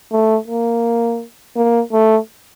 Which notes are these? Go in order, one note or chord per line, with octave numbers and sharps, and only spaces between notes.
A3
A#3
A#3
A3